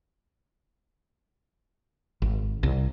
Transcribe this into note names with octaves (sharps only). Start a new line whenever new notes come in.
G#1
C2